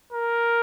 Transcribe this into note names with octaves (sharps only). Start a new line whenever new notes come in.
A#4